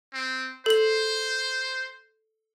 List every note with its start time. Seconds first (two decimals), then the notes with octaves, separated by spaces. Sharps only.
0.14 C4
0.66 A4 C5 F#7